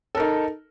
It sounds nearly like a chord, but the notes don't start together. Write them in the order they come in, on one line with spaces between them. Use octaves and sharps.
A4 A#4 D#4